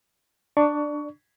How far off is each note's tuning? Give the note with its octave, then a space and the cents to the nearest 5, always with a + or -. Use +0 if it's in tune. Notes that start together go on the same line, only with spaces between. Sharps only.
D4 +10 D5 +0 C#6 +25